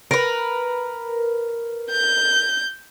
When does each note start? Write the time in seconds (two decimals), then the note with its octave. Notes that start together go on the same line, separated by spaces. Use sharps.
0.11 A#4 B4
1.91 G6